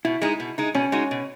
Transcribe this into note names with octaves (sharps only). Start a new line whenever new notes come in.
B2 E4
G#3 D#4
B2
G#3 D#4
B2 C#4
G#3 D#4 F#4
B2